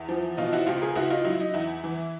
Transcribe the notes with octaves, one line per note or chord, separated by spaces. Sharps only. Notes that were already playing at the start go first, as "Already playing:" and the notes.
Already playing: E2 E4
F3
B2 D#4 F4
E4 F#4
C#2 F4 G4
G#4 A#4
C#2 E4 F#4
D#4 F4
F#3 E4
D#4
E2 E4
E3